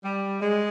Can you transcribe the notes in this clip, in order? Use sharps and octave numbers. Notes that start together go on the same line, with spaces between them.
G3
G#3